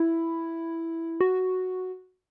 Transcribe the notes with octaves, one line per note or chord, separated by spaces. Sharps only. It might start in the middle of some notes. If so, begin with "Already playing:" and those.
Already playing: E4
F#4